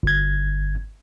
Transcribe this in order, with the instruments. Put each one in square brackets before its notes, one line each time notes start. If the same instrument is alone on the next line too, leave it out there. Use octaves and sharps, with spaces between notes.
[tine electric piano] G1 G#6